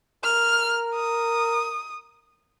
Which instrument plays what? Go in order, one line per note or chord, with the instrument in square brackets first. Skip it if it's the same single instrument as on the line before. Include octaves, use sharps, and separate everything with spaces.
[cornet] A#4 [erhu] F6
[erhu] D#6